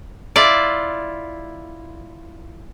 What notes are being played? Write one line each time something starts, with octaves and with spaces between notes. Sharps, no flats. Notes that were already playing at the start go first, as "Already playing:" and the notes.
E4 F4 D5